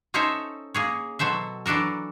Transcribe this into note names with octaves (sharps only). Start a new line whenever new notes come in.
C#4 D#4 A4 C5 C#5 E5
A#3 G#4 C#5
B2 F#3 A4 C5 E5
E3 F#3 D4 A4 A#4